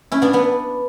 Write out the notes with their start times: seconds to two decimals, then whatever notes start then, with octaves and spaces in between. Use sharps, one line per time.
0.12 C#4 E4
0.22 B3 D4
0.33 B3 D4